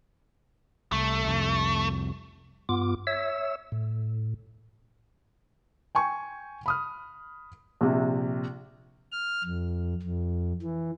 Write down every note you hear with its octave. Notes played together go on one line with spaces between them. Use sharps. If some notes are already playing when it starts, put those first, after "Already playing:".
C2 A3
C2 F2
G2 B3 F4 D6
C#5 E5 E6
A2
G5 G#5 C#6
B5 D#6 F6
A#1 C3
F6
F2
F2
E3